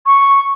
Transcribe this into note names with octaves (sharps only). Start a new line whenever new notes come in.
C#6